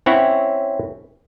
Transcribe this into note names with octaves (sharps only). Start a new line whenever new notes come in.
C4 C#4 E4 C#5 F#5 G5